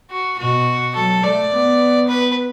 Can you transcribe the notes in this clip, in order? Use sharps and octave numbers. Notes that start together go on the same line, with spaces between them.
F#4
B2 F#4
F#3 A4
A3 D5
B3
B4